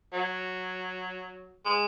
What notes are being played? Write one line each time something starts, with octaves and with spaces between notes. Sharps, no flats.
F#3
G#3